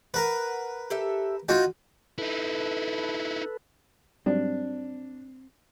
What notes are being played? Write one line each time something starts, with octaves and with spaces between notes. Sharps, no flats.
A#4 B4 F#5
G4 A4 E5
D#4 F4 F#4 G5
D#4 E4 A4 B4
G#2 F#3 G3 C4 D4